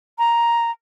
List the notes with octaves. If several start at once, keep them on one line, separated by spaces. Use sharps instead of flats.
A#5